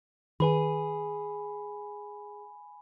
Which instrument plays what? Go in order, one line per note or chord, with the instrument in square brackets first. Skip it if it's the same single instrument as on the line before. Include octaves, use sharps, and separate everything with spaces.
[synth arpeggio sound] D#3 B4 [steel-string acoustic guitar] G#4 [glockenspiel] G#5 B5